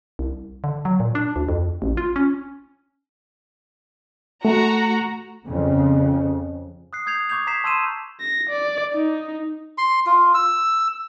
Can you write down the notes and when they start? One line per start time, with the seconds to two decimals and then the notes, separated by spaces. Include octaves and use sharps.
0.19 C2
0.64 D3
0.85 F#3
1.00 A#2
1.15 D4
1.36 D2
1.49 F2
1.82 A1
1.97 F4
2.16 C#4
4.45 A3 F#4 A#5
5.46 F2 C#3
6.93 D#6 F#6 C7
7.06 D#6 G6 G#6 C7 F7
7.29 C#6 D6 G6 G#6 F7
7.47 A#5 G#6 B6 C7 E7
7.64 A5 C6 E6 G6 D#7 E7
8.20 A#6
8.49 D5
8.94 D#4
9.78 C6
10.06 F4
10.34 E6